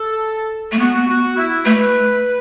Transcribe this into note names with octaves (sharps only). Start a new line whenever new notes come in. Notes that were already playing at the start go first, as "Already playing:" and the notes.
Already playing: A4
A3
B3 F#4
F#4
E4
A3 B4